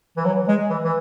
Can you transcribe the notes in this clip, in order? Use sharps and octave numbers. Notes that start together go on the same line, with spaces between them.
E3
F#3
G#3
E3
E3